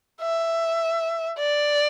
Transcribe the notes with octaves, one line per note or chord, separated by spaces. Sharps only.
E5
D5